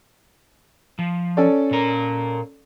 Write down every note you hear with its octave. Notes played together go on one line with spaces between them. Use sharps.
F3
C#4 A4 D5
A#2 A#4